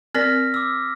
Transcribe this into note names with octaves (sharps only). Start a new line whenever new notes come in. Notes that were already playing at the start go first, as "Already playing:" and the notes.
C4 A#4 D5 F6 A#6 B6
D6 E6